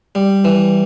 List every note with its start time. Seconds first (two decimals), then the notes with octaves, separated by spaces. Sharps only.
0.15 G3
0.45 E3